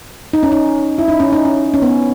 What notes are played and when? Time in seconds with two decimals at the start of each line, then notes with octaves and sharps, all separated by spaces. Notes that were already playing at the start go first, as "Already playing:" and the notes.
0.33 D#4
0.43 C#4
0.52 D#4
0.98 E4
1.08 D#4
1.20 C#4
1.33 D#4
1.45 C#4
1.74 C#4
1.82 B3